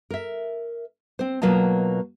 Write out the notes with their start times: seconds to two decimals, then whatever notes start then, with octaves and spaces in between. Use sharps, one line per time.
0.10 A#4 E5
1.19 C4 C5
1.42 B2 F#3 A#3 F4 D#5 A5